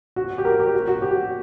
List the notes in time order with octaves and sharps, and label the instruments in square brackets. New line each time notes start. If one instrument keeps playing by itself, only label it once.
[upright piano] F#4
G4
A#4
G4
F#4
F#4
G4